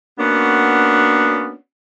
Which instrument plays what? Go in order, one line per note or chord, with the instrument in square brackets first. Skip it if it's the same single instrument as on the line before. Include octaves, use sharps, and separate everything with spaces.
[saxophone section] A#3 B3 C#4 D4 F#4